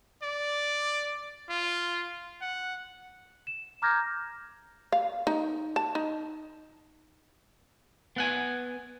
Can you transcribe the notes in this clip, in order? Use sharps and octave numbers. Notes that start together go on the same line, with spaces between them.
D5
F4
F#5
E7
A#5 D6 F6 G6 G#6 A#6
F5
D#4
A5
D#4
B3 F#5 G#5